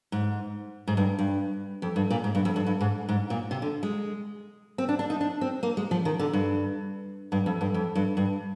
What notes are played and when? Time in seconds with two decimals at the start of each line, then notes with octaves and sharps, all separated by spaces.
0.12 G#2
0.88 G#2
0.97 G2
1.19 G2
1.82 F2
1.96 G2
2.10 A#2
2.24 G#2
2.35 G2
2.45 F2
2.56 G2
2.66 G2
2.81 G#2
3.09 G#2
3.30 A#2
3.51 C3
3.62 D3
3.83 G#3
4.78 C4
4.89 D4
4.99 D4
5.10 D#4
5.21 D4
5.41 C4
5.63 A#3
5.77 G#3
5.91 F3
6.05 D#3
6.19 D3
6.33 G2
7.32 G2
7.46 F2
7.61 G2
7.74 F2
7.95 G2
8.17 G2